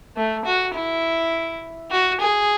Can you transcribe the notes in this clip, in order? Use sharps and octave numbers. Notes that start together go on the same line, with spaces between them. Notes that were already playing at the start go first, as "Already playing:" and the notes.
A3
F#4
E4
F#4
G#4